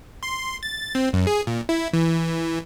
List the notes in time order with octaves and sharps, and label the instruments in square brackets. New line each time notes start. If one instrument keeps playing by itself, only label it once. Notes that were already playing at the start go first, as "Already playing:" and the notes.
[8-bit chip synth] C6
A6
C4
F#2
G#4
A#2
E4
E3